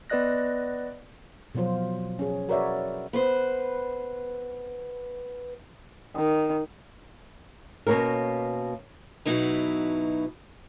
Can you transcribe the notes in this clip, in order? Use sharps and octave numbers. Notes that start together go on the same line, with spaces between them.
B3 B4 D5 D#5 F#6 A#6
B2 F3 F#3 F4 C5
C#4 G#4
F#4 A#4 B4 C#5 D5 E5
B3 B4 C5
D#3
B2 A#3 C#4 A#4
B2 F#3 D#4 E4 B4